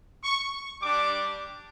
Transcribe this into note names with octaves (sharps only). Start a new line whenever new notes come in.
C#6
G3 D4 G4 D6